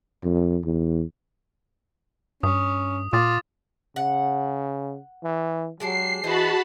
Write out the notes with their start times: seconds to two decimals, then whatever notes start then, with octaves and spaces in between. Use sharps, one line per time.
0.24 F2
0.65 E2
2.43 G2 C#4 D#6
3.13 A#2 F4 D6 D#6 A6
3.96 C#3 F#5
5.23 E3
5.80 F#3 G#3 D4 G4 C7
6.24 E3 F#4 G#4 C5 D#5 A5 B5